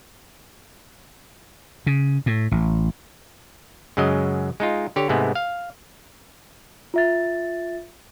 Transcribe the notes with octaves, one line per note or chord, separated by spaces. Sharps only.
C#3
A2
A1
F#2 C#3 F#3 G#3 D#5
G#3 D#4 F4
D3 G4 C#5
G#2 C3 G#3 A3 B3
F5
F4 E5 A6